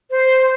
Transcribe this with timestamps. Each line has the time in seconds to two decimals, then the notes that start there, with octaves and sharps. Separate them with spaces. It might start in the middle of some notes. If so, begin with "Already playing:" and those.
0.10 C5